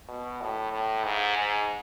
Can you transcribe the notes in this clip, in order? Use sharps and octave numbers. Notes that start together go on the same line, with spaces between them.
B2
A2
A2
G#2
G#2